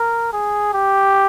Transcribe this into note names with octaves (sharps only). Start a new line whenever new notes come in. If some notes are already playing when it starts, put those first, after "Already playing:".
Already playing: A#4
G#4
G4